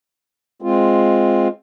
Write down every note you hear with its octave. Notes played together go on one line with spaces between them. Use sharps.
G#3 C4 F4